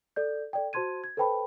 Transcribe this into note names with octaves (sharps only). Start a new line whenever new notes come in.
A4 D5 G6
A4 D5 G5
F#4 C5 A5 C6 G#6 D#7
G#6
A4 B4 C5 G5 A5 B5